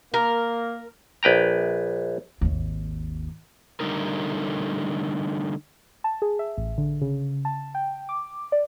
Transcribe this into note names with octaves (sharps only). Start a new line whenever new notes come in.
A#3 A#4
A#1 B4 G5 A#5
G#1 D#2
D3 G3 A3 D#4 A#4
A5
G#4
E5
A1
D3
C#3
A5
G5
D6
D5